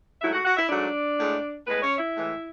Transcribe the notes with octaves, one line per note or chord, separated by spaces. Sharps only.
G#2 F#3 A3 E4 E5
F#4 F#5
F#4 F#5
E4 E5
G#2 F#3 A3 D4 D5
A2 G#3
A2 G#3 B3 B4
C#4 C#5
E4 E5
A2 E3 G#3